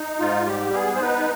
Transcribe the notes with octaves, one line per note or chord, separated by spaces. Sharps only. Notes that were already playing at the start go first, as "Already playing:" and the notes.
Already playing: D#4
G#2 F4
G3 G4
B3 G#4
C5
D#4 B4